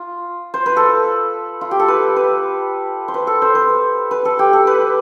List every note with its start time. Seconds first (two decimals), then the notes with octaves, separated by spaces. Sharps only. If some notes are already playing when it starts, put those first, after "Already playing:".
Already playing: F4
0.54 C5
0.66 B4
0.77 A4
1.61 F4
1.71 G4
1.79 A4
1.88 B4
2.16 B4
3.08 C5
3.14 B4
3.27 A4
3.42 C5
3.55 B4
4.11 B4
4.25 A4
4.39 G4
4.53 A4
4.67 B4